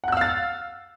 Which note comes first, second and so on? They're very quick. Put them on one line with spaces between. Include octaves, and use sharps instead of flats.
F#5 F#6 E6 F5 A6